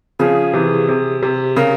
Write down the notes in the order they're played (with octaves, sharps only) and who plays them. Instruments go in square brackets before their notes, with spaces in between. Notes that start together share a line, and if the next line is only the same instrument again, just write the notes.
[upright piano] C#3 F3 [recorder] G#4
[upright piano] C3 E3
C3
C3
[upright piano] C#3 [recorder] A#4